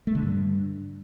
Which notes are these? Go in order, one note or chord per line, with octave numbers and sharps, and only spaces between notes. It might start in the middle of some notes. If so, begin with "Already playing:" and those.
A3
D3
G2